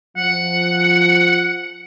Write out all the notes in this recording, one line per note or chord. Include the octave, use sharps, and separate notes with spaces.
F3 F#5